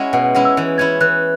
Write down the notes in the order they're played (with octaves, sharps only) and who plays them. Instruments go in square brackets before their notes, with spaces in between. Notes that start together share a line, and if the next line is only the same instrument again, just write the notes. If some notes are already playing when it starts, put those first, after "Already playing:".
Already playing: [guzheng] G#3 C#4 E4 F#4 [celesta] F#5
[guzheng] B2 [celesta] F#5
[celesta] F#5
[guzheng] G#3 C#4 E4 [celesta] F#5
[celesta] E6
[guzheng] E3
[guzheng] C#4 E4 [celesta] G#6
[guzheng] E3 [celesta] F#6